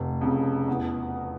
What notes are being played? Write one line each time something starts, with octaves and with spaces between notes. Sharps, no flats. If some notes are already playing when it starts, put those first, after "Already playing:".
Already playing: F1
F2 C#3
E2